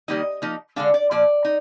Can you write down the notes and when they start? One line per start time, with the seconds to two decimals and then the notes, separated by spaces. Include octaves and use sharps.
0.08 D#3 G3 A#3 D#4 D#5
0.42 F3 A#3 D#4
0.76 D3 G#3 D4 F5
0.94 D5
1.11 A#2 F3 D5
1.45 D#4